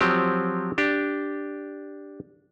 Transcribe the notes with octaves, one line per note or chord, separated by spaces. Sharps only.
F3 F#3 C4 G4
D4 G4